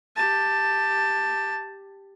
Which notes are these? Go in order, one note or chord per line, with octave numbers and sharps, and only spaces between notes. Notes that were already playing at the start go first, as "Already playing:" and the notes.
G4 A5